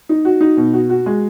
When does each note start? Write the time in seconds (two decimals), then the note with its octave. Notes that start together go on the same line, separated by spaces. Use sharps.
0.09 D#4
0.25 F#4
0.41 D#4
0.57 B2
0.73 F#4
0.90 F#4
1.06 G#3